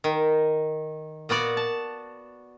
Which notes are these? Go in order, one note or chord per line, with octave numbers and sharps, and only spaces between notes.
D#3
A#2 B3 F#4 D5
A5